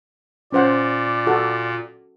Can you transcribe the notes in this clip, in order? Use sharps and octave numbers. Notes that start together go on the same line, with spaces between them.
A#2 C#4 C5 D5 F#5
F#4 A4 F#5